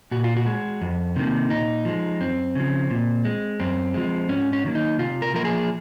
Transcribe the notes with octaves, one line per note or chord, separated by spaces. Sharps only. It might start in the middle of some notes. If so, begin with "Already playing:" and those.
A#2 F#4
F4
F#4
G#3
F2
C3 D#3 A#3
A#2 D#4
F3 G#3
F#2 C4
C#3 F3
A#2
G#3
F#2 C4
F3 G#3
G#2 C#4
C#4
D#3 F#3 A#3
D#4
C3 F4
A#4
F3 A#3 A#4
G#4